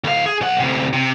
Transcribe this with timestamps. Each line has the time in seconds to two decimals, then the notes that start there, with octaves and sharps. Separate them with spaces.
0.04 D2 F5
0.26 G#4
0.41 B1 F#5
0.60 D2 C3
0.93 C3